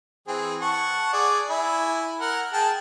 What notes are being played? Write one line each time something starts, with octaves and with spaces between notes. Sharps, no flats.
E3 C4 G#4
F#5 A5 C#6
G#4 D5
E4 G#5 B5
A#4 F#5
G#4 G5 A5